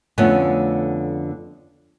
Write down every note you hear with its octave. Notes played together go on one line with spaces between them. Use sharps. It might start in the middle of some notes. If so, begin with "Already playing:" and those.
F2 D3 A3 B3 C#4